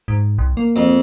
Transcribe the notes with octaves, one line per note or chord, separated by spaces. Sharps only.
G#2
C2
A#3
F2